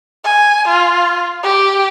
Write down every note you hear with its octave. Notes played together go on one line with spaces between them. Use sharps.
G#5
F4
G4